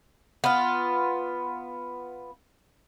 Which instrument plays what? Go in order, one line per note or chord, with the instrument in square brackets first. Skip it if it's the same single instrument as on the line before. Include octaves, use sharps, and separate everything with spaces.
[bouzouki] B3 F4